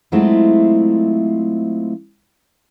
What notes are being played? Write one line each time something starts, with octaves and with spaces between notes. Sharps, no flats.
F#3 G#3 A3 C4 E4 F4